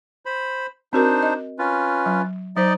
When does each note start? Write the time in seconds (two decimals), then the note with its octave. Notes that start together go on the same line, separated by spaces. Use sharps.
0.26 C5 B5
0.93 C4 D4 D#4 F#4 A#4 C5
1.22 D#5
1.59 C#4 F4 B4
2.06 F#3
2.56 F#3 D#4 C5 D5 D#5